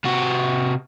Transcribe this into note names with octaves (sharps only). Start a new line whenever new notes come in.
C3 F#4